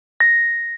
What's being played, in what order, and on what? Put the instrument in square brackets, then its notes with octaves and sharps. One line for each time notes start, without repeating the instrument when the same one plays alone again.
[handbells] A#6